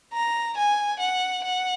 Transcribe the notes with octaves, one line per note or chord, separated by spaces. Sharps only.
A#5
G#5
F#5
F#5